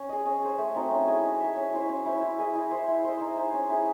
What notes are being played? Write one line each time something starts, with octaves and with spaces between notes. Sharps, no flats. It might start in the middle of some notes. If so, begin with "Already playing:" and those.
Already playing: C#4
G#4 D#5
C#4
G#4 C5
A3
C4 D#4 F#4
C#4
E4 G#4 D#5
D#4
G#4 C#5 E5
C#4
E4 C5 E5
C#4
E4 C5 E5
E4
G#4 D#5
E4
C5 E5
E4
C5 D#5
D#4
G#4 C5
C#4
E4 G#4